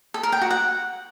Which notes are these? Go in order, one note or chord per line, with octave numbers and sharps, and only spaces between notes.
A4
A#4
G5
F#4
F#5